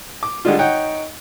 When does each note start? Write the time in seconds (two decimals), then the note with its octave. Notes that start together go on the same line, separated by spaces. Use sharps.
0.23 D6
0.45 D3 G3 G#3 D4 F4
0.59 D#4 C#5 F#5 G5